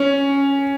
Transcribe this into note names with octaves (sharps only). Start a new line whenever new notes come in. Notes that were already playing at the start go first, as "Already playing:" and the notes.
Already playing: C#4